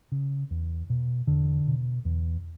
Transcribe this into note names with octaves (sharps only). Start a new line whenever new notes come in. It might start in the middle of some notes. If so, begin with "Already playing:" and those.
C#3
E2
B2
E2 D3
B2
E2